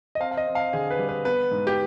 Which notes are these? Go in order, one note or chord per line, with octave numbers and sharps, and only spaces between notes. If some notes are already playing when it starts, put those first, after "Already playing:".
D#5
C4 F5
F5
D#5
C4
F5
D3 G#4
B4
G3
B4
B3 B4
G#2
G4